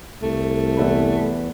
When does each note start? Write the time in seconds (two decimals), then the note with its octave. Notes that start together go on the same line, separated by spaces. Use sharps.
0.22 C2 A3
0.77 E2 B2 B4